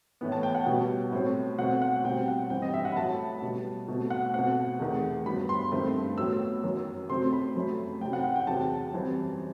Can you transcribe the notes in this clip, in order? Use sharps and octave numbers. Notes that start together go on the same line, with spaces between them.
A2 E3 B3
A5
G5
F#5
B2 G3 B3
A2 F#3 C4
B2 A3 C4 F#5
F#5
B2 G3 C4 G5
F#5
G2 E3 G3 C4 G5
D#5
E5
F#5
B5
A2 F#3 A3 A5
B2 G3 B3
B2 A3 C4
F#5
B2 A3 C4 F#5
E2 C3 D#3 A3
G2 F#3 B3 B5
C6
G2 D#3 A3 C4
A2 F#3 B3 E6
F#2 D#3 F#3
C3 F#3 A3 C4 C6
B5
F#2 F#3 A3
C3 F#3 A3 G5
F#5
F#5
G5
E2 C3 F#3 A5
F#2 E3 G3 C4